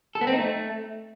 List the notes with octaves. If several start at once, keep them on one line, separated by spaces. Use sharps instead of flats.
A4
B3
C4
D#4
A3